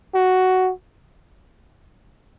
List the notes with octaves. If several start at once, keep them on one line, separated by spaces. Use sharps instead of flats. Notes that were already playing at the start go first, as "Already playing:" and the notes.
F#4